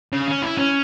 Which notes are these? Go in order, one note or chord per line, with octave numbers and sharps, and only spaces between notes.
C#3
C#4
E4
C#4